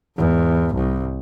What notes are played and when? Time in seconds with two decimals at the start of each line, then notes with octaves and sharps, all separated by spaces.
0.17 E2 G#2
0.74 C2